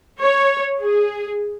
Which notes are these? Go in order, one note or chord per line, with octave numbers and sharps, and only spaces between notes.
C#5
G#4